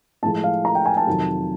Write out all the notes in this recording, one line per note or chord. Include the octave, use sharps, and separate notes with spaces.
A2 F3 G#3 A5
F5
A#5
G5
G#5
A5
F2 C3 D#3 F#3